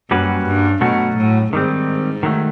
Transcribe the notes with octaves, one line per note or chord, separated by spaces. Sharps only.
F#2 G3 A#3 C#4 F#4 B4
G2
B2 F#3 A3 C#4 F#4
A2
G#2 D#3 G3 C4
D#3 F#3 A3